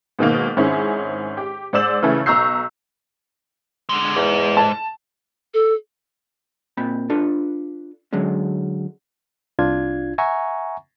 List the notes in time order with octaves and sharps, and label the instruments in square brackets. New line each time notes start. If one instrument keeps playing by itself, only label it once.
[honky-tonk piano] G#2 B2 D#3 A#3
G#2 D#3 C4 C#4 E4 G#4
G4
G#2 C5 D5 E6 E7 F#7
C#3 E3 A3
B1 A#5 C#6 E6 G6 C7
[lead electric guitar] D3 G#3
[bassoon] E2 [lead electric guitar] G#2
[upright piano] A5
[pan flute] A4
[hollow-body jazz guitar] A#2 C4 B5
D4 F4 A4 B4
D3 F#3 G#3 C#4
[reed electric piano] C2 D4 F4 G#6
E5 F#5 G#5 A#5 C#6